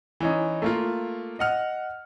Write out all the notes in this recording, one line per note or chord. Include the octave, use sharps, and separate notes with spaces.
E3 C#4 D#4
A3 A#3 F4
D#5 F#5 F6